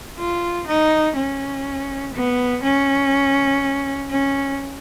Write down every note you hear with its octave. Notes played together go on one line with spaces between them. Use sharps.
F4
D#4
C#4
B3
C#4
C#4